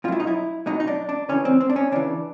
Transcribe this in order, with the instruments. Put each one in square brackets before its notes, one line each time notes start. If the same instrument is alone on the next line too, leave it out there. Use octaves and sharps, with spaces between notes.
[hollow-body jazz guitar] B2 F4
F#3 E4
D#4
E4
B2 F#3 D#4
D#4
D4
D4
C#3 E3 C#4
C4
C4
D4
C#4
C#3 E3 D4